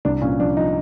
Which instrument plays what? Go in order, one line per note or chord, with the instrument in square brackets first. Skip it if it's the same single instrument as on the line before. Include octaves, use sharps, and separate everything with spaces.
[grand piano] C2 D4
A#2 C#4
F3 D4
F3 D#4